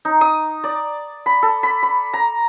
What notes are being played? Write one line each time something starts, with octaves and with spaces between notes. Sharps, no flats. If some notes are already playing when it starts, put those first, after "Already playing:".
D#4
D#6
D5
B5
A4
B5
B5
A#5